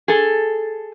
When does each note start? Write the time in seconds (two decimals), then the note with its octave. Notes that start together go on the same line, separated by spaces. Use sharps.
0.08 G#4 A4